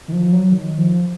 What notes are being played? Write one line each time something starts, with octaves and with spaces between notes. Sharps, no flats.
D#3
F3
F#3
D#3
F3